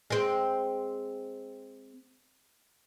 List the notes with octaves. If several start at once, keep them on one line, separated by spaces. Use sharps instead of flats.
G#3 C4